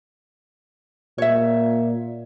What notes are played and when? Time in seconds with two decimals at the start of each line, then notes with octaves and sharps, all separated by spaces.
1.18 A#2 C#5 E5